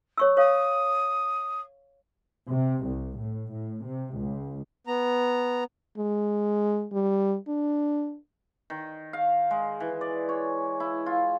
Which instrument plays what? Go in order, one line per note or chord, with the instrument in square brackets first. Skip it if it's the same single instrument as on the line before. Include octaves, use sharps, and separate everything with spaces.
[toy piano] C#5 C#6 E6
[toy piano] C#5 F5 [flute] D#6
[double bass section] C3
C2
A2
A2
C3
C#2
[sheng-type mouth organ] B3 A#5
[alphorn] G#3
G3
D4
[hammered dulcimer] D#3
F5
G#3
E3
D5
C#5
E4
F4